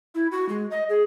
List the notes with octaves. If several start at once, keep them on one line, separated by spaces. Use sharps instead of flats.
E4
F#4
G#3
D#5
G#4